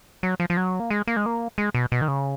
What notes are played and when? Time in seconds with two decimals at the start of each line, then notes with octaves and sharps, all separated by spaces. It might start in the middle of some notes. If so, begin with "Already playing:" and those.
0.23 F#3
0.40 F3
0.50 F3
0.57 F#3
0.80 A#3
0.90 G#3
1.07 A#3
1.17 G#3
1.26 A#3
1.58 G#3
1.75 B2
1.92 B2
2.01 D#3
2.08 C#3